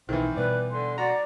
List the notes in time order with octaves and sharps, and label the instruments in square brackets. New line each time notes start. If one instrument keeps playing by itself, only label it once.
[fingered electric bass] B1 [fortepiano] D#3 E3 [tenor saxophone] C4
[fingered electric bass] B2 G3 [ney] B4 [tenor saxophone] D5
[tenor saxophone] D3 [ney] C6
[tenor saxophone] F#4 [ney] D5 [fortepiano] A#5